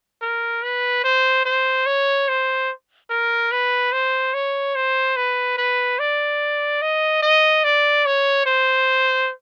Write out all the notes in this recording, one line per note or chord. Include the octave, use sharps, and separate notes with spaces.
A#4
B4
C5
C5
C#5
C5
A#4
B4
C5
C#5
C5
B4
B4
D5
D#5
D#5
D5
C#5
C5